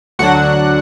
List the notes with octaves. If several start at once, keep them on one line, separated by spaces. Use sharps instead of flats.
D2 D3 F#3 D4 F#4 F#5